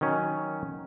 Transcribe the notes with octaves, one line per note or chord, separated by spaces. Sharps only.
D#3 F#3 C#4